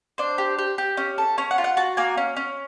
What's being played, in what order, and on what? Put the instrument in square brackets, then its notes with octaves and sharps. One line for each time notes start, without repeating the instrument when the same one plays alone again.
[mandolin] D4 C5
G4
G4
G4
C#4
A4
C#4 C#5
F#5
F4
F#5
F#4 A5
A#3 G#5
C#4
C#4